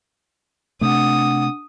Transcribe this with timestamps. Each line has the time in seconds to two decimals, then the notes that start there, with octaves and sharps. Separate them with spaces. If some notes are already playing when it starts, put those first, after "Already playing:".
0.81 C3 A3 D4 F#5 D#6